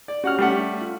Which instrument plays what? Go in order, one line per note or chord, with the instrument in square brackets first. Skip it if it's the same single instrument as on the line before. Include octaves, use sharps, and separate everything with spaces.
[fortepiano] D5
[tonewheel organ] C#4 G4 [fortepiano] F#4 F#5 F6
[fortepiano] G3 A3 F#5
[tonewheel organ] F4